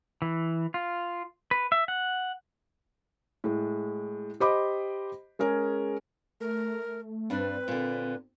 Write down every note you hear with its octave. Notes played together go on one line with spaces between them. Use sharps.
E3
F4
B4
E5
F#5
A2 G#3
G4 C5 D#5 B5 D6
G#3 C#4 G#4 A#4
A3 A#4
G2 C4 D4 B4
A#2 D3